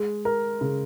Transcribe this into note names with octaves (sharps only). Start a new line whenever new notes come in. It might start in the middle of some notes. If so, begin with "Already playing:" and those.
Already playing: G#3
A#4
C#3